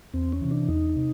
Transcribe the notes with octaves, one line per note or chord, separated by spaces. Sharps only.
E2 C4
C#4
C3 E3
D4
E2 D#4
C3